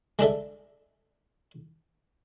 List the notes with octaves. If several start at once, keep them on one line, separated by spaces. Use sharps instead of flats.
G#3 D4 A4 E5